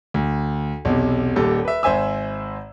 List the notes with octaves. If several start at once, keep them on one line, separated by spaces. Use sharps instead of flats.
D2
B1 E2 C3
D#1 D#2 G3 A4
B4 E5
G#1 C5 E5 G#5 E6